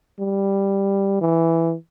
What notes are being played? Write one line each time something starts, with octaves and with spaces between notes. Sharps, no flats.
G3
E3